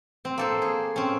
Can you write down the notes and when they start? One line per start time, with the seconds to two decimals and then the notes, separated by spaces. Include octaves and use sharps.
0.25 C4
0.38 A#3 A4 C5
0.62 G#4
0.96 C4 C#4